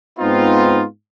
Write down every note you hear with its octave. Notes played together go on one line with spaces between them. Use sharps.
G#2 B3 C4 D#4 F4